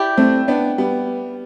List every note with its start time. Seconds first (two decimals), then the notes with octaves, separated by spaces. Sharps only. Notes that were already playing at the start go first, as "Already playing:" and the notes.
Already playing: E4 G4 D5 G5
0.17 A3 C4
0.48 B3 D4
0.78 G3 B3